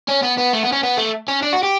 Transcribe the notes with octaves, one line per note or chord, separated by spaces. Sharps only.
C#4
B3
B3
A3
B3
C#4
B3
A3
C#4
D4
F#4
G4